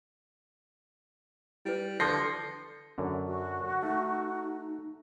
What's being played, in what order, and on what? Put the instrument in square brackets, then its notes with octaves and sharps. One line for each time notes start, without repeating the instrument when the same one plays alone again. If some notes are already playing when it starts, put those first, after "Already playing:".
[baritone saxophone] G3 [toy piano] E4 B4
[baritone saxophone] D3 [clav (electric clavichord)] F3 [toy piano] G4 B4 [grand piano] G6 A#6 C7
[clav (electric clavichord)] F#2 D3
[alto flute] F#4
[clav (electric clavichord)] A3 [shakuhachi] D#4